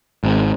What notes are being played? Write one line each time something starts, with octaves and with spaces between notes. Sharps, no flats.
G#1